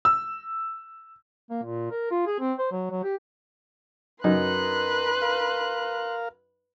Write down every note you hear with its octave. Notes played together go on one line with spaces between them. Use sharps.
E6
A#3
A#2
A#4
F4
G#4
C4
C5
F#3
F#3
G4
F#2 D#4 A#4 B4 C6 F#6
A#4 F5